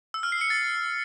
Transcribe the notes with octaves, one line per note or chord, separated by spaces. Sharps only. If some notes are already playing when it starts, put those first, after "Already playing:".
E6
F6
C7
C#7
A6